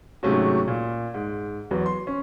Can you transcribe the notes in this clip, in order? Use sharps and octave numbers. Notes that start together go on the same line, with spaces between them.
G#2 C3 F#3 A3 C#4 F#4
A#2
G#2
E2 F#3 B4
C6
C#4